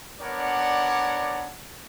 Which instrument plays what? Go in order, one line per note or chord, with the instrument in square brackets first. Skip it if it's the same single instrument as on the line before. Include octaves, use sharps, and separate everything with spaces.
[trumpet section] B3 D4 A#4 C#5 D5 F#5